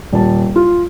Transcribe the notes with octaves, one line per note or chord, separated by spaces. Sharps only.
D#1 A5
F4